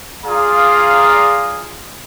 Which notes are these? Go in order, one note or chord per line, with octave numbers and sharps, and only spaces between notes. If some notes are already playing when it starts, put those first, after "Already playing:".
F4 G#4 D5 F5 A#5 D#6